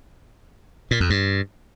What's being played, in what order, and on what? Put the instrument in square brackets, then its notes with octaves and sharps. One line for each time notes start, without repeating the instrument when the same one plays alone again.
[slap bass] A#2
F2
G2